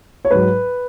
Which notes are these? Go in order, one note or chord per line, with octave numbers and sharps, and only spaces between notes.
C#5
G#2 F#3 B4